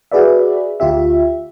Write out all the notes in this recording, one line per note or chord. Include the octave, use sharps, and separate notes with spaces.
F#4 G#4 B4 D5 E5
D2 F4 G4 E5